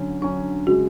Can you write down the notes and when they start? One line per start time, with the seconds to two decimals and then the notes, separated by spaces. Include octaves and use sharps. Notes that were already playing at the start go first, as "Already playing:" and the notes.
Already playing: D3 F#3 C#4
0.21 D3 F#3 C#4 D4
0.67 C#3 G#3 F#4